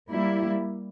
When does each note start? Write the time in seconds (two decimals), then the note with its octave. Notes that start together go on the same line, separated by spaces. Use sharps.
0.11 G3 A#3 E4